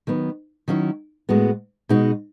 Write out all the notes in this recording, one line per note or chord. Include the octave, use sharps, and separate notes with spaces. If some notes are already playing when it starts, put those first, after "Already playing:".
D#3 F#3 B3
D#3 F#3 C#4 E4
A2 G#3 B3 F#4
B2 G#3 D#4 F#4